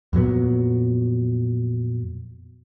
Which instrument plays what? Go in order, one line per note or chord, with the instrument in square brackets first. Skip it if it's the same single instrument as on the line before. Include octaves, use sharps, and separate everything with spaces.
[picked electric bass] F2 A#2 F#3 B3